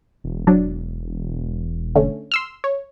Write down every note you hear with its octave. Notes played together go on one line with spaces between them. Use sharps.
E1
F#3 D4
D3 A3 C#4
C6 E6 F6
C#5